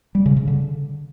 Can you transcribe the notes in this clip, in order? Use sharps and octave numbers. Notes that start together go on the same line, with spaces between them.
G3
C#3
C#3
D3